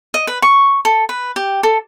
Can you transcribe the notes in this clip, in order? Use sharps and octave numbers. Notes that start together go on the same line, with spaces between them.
D#5
B4
C#6
A4
B4
G4
A4